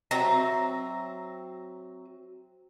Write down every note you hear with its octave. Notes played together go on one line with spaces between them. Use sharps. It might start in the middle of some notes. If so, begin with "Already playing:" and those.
F#3 C4 E5 A#5